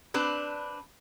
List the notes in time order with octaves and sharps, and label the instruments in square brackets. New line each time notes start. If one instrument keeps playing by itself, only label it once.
[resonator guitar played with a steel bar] C4 D4 B4